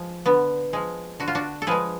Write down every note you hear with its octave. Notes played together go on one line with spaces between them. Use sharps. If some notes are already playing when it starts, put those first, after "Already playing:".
Already playing: F3 G#3
D3 B3
F3 G#3
D3 F#4
F4
D4 F#4
A4
F3 G#3 G#4 B4